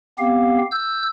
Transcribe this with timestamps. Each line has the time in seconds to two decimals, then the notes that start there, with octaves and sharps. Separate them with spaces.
0.19 B3 C4 G4 F5
0.71 E6 G6